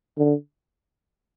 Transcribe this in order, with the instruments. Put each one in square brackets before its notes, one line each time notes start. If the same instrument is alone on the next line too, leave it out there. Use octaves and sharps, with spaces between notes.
[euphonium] D3